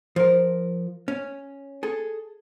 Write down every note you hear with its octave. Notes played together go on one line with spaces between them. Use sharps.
F3 A#4
C#4
G#4 A4